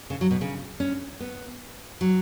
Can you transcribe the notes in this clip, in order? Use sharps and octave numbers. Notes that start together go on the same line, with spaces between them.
C#3
F#3
B2
C#3
C#4
B3
F#3